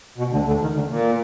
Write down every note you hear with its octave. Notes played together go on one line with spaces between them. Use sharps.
B2
D2 D3
D2 D3
D#2 D#3
D2 D3
A#2